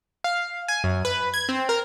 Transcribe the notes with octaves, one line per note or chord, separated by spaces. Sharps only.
F5
G#5
F#2
B4
G#6
C4
A#4